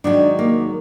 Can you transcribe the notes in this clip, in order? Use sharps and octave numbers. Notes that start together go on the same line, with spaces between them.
G#2 D#3 F#3 D4
A#3